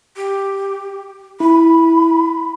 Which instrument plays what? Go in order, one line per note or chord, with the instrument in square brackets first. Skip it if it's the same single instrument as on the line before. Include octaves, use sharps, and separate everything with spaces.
[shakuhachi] G4
[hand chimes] E4 [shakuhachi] B5